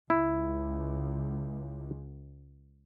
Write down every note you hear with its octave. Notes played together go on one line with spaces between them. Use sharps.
C#2 E4